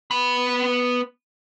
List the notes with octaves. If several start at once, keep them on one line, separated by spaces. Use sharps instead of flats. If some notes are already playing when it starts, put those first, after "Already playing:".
B3 B5